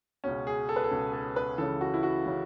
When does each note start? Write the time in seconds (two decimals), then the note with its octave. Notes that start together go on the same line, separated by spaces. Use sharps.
0.24 C#2 B2 C#4
0.47 G#4
0.69 A4
0.76 B4
0.84 A4
0.91 C#2 B2
1.13 A4
1.36 B4
1.58 C#2 C#3 E3 A4
1.81 F#4
1.94 E4
2.03 F#4
2.26 C#3 E3